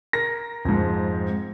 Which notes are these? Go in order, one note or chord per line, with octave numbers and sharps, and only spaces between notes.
A#4 A#6
F2 G#2